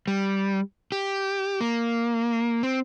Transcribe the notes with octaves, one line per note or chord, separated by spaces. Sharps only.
G3
G4
A#3
C4